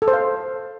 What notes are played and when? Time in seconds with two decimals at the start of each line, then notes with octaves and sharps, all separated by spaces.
0.02 A4
0.08 C5
0.13 F5